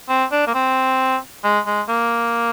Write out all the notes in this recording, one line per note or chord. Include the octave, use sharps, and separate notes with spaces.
C4
D4
A#3
C4
G#3
G#3
A#3